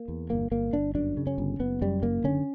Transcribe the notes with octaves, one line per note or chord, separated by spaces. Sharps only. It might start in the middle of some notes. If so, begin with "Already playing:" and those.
Already playing: A#3
E2
G1 A#3
G1 A#3
G1 D4
F#2 D4
C#3
C#4
G1
F#1 B3
F#2 G3
F#1 A#3
D3 C#4